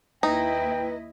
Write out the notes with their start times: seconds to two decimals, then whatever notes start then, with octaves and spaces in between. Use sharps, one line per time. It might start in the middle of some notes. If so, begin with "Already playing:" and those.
0.23 D#2 D#4 E4 B4 D#5 G5